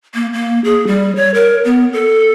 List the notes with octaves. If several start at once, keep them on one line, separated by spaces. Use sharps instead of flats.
A#3
A#3
G#4
G3
C#5
A#4
B3
A4